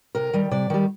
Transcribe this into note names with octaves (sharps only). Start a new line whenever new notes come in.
C3 A#4
D#3 G3
C3 D5
D#3 G3